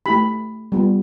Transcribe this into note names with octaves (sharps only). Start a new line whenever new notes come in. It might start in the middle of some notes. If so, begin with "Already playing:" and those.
A3 E4 G4 B5
G3 B3 F4